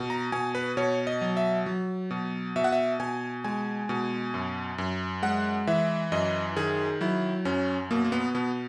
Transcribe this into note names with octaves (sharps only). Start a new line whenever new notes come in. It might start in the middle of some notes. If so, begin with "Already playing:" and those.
Already playing: B2
A#5
B2 G#5
B4
B2 C#5
D#5
F#3
E5
F#3
B2
B2 E5
F#5
E5
B2 G#5
G#3 G#5
B2
F#2
F#2
G#3 F#5
E3 E5
F#2 D#5
D#3 G#4
F#3 E4
F#2 C#4
B2 A#3
A#3
B3
B2 B3